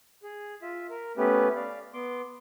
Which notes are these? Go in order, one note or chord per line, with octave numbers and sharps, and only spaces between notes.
G#4
F4 E5
A#4
A3 B3 C#4 G4 B4
D5 F5
B3 C6 D6